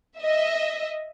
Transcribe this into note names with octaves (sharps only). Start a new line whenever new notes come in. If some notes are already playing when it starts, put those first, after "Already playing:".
D#5 E5